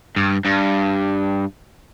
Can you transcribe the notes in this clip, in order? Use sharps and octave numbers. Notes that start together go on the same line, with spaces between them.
G2
G2